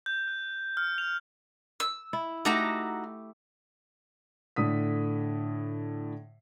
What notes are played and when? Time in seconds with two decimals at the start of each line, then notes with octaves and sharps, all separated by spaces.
0.06 G6
0.28 F#6
0.77 F6
0.98 F7
1.80 E6
2.13 E4
2.45 A3 D#4 F#4 G4 A4 A#5
4.56 A2 D3 D#6 B6